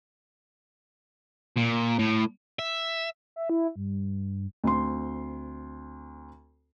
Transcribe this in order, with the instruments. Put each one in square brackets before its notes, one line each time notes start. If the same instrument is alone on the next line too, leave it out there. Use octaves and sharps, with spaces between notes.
[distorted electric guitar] A#2
A2
E5
[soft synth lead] E5
E4
G2
[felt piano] D2 C4 C6